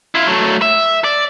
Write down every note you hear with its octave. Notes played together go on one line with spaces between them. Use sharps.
E4 F4
F#3 A3
E5
D5